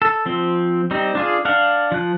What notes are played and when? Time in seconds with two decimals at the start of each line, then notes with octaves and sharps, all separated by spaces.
0.02 A4
0.26 F3 C4
0.91 G3 C4 D#4
1.15 D4 F4 G#4
1.45 D4 F5 F#5
1.92 F3 F#6